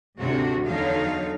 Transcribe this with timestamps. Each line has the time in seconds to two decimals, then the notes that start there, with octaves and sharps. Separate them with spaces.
0.19 D2 G#2 C3 D4 F#4
0.66 E2 D3 F#3 D#4 F5